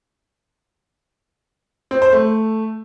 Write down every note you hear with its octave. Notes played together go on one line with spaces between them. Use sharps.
C4
C5
A3